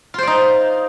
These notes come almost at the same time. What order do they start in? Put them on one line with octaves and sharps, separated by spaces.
F4 C5 D5 D#4